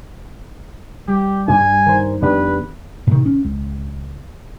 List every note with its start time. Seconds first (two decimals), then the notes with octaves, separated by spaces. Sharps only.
1.08 G3 G4
1.48 G2 D4 G#5
1.86 D#3 A#4 C5
2.22 F2 B3 D4 G4 B4
3.07 A2 C3 D#3
3.26 C#4
3.45 C#2